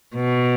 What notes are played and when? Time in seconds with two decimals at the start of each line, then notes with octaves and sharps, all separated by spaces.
0.15 B2